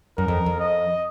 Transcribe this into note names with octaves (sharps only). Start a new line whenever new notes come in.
F#2 A#4
F2
F2
D#5